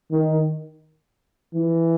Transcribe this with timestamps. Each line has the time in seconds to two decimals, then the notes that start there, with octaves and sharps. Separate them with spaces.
0.11 D#3
1.55 E3